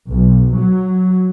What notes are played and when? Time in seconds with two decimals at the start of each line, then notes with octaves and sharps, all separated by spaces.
0.10 B1
0.58 F#3